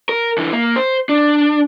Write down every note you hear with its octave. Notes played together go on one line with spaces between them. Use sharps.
A#4
D3 E3
A#3
C5
D4